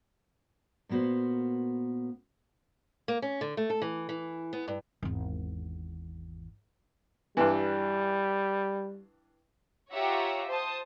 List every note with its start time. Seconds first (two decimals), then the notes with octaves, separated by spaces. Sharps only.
0.89 A#2 A#3 B3 F#4 C5
3.08 A#3
3.22 C#4
3.41 D3
3.57 A3
3.70 A4
3.82 E3
4.09 E3
4.53 B3
4.68 G2
5.03 G#1 E2
7.37 G2 E3 G3
9.92 F4 G4 C#5 E5 F#5 A#5
10.49 C5 A5 D#6